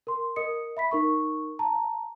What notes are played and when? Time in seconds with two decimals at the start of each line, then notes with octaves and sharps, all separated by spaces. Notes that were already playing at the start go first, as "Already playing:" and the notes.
0.07 A#4 C6
0.36 A#4 D#5 D#6 C#7
0.77 E5 B5 B6
0.91 D#4 A#4 C#6
1.59 A5 A#5